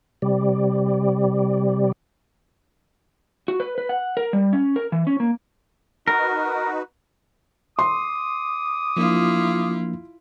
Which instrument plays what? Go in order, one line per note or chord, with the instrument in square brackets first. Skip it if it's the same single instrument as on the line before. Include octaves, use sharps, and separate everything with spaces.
[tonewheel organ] C3 G3
[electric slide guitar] F#4
B4
B4
F#5
A#4
G3
C#4
A#4
E3
C#4
A#3
[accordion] D#4 F#4 B4 [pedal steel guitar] A#4
[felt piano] C6 [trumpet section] D6 D#6
[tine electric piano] F3 A#3 D4 [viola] E4 F4